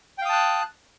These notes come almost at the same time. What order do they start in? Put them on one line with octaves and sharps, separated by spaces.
G5 F5 D#6 A5 F#6